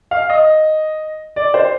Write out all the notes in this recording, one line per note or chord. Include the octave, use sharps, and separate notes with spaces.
F5
D#5
D5
C5